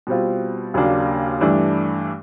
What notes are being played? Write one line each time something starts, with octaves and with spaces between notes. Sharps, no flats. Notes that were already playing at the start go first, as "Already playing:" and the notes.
B2 G3 C4 F4
D#2 C#3 F#3 A#3 D4
G2 E3 A3 D4